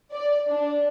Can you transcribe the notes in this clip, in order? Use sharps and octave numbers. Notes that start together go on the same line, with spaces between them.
D5
D4